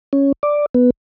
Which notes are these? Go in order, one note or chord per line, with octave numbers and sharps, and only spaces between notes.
C#4
D5
B3